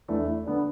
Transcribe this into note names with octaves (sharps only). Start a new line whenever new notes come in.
E2 E3 A3 D4
D3 B3 D4